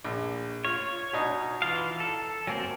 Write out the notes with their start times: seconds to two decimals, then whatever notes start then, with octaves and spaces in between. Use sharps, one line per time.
0.05 A#1
0.65 F4 C#5
1.13 B2 D4 D#4
1.62 E3 F4 F5
2.00 A4
2.47 F#3 A#3 C4 G#5